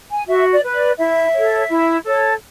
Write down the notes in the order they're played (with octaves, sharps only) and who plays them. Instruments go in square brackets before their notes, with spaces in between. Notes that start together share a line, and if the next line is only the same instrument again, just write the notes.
[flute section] G#5
F#4 E5
D5
B4
D5
E4 E5
A4 C#5
E4
A4 C#5